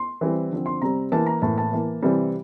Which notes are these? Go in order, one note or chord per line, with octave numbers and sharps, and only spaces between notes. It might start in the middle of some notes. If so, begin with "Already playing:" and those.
Already playing: C6
E3 G3 C4
D3 F3 C4
C6
C3 G3 C4 A#5
E3 A#3 A5
A#5
A2 E3 A#3 A5
A5
E3 A#3
C3 E3 G3 C4